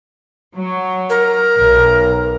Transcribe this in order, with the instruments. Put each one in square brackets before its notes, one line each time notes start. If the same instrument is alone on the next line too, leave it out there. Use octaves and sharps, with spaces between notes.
[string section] F#3
[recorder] A#4
[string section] B1